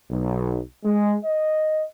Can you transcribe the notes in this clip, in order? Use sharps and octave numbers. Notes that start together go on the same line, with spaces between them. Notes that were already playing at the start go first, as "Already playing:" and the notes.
B1
G#3
D#5